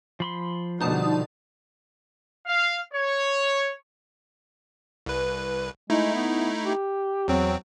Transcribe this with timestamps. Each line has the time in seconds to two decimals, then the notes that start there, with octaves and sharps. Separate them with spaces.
0.20 F3 B5 C6
0.81 B2 D3 G3 D#4 A5 D#6
2.46 F5
2.93 C#5
5.06 C2 B4
5.90 G#3 A3 D#4 E4
6.14 B3
6.64 G4
7.28 E2 F#3 C4